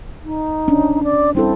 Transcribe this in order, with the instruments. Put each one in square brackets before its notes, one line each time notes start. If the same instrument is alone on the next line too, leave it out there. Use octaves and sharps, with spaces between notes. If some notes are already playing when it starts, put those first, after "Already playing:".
[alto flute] D#4
[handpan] C#4 D4
[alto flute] D5
[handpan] G3 E4 A4 [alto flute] C4